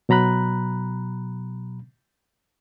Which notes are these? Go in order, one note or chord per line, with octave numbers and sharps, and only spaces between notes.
B2 F#3 A#5 B5 F#6